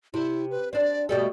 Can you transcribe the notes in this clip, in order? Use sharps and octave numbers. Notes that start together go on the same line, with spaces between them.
C3 E4
B4
C4 D4 D5
B2 G3 A3 D5